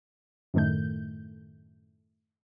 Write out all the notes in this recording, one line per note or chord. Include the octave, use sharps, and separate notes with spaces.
F#2 A2 D#3 A3 G6